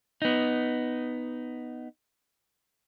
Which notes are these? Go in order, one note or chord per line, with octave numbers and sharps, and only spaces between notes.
B3 D#4